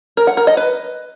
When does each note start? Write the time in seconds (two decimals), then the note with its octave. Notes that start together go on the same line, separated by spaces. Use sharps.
0.17 A#4
0.27 F#5
0.37 A#4
0.47 D#5
0.57 B4